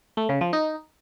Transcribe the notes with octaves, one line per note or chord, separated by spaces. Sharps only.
A3
C#3
F3
D#4